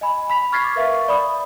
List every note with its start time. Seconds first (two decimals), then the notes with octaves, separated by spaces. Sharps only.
0.01 D#5 G#5 B5
0.30 B5 B6 F7
0.52 C#6 F6 G#6 A6 B6 C7
0.64 D6 A6
0.76 A#4 B4 E5 F5 C#6 A6
1.08 D5 B5 D#6